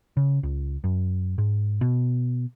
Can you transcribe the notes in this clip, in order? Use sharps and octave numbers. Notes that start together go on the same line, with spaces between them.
C#3
C#2
F#2
G#2
B2